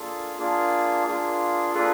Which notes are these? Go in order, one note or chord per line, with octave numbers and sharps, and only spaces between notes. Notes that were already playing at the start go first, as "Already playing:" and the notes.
Already playing: A#3 D4 F4 G#4 A4
A#3 D4 F4 G#4
A#3 D4 F4 G#4
A#3 D4 F4 G#4 A4 B4